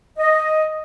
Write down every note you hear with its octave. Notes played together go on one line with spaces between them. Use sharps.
D#5